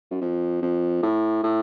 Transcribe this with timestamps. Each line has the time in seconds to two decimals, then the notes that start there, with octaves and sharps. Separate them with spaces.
0.11 F#2
0.21 F2
0.62 F2
1.03 A2
1.43 A2